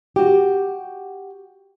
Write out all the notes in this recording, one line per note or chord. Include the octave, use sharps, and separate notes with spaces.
F#4 G4